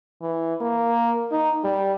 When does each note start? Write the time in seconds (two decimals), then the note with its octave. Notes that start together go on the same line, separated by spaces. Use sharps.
0.22 E3
0.61 A#3
1.32 D#4
1.64 G3